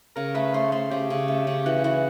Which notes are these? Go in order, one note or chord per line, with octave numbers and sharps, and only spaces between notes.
C#3 A#4
A3 B4
A3 C5
A3 C5
C#3 G4
C#3
A3
C#3
E3 F#4
E3